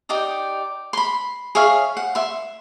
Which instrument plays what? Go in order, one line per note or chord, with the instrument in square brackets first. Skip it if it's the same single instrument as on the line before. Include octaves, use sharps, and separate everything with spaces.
[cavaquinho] D#4 G4 D5 D#6
B5 C6
G#4 C#5 E5 F5
F#5
E5 C6